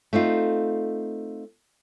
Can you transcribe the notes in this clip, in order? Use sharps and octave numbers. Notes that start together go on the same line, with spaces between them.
A3 C4 D#4 F4